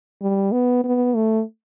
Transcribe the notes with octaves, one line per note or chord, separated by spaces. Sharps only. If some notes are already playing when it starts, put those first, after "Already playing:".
G3
B3
B3
A3